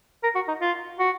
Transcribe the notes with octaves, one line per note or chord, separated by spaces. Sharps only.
A#4
F#4
D#4
F4
F#4